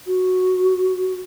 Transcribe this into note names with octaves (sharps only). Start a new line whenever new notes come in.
F#4